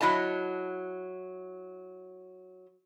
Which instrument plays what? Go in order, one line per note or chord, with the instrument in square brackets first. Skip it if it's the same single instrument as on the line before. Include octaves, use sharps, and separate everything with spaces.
[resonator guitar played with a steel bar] F#3 E4 D#5 A5